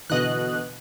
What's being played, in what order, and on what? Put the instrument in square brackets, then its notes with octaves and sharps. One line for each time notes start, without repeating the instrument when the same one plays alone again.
[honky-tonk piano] B2 D3 E3 [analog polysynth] D#5 F#6